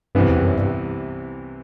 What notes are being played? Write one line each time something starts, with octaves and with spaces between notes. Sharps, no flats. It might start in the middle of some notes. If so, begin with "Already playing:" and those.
C2 G2 C3 E3 B3
E2
F#2
G2